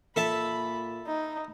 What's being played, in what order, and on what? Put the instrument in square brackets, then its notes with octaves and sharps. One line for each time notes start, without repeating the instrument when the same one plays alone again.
[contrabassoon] A#2 [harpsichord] A4 E5 A5 [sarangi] B5
[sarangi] D#4